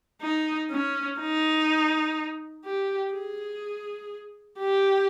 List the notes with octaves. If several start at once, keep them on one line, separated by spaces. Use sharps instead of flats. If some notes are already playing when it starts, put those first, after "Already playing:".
D#4
C#4
D#4
G4
G#4
G4